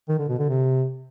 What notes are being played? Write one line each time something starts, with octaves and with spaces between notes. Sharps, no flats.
D#3
D3
B2
D3
C3